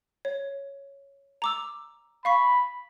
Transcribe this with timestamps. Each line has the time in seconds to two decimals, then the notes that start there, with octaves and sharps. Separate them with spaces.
0.25 C#5
1.42 A#5 D6 E6
2.25 F5 B5 C#6 B6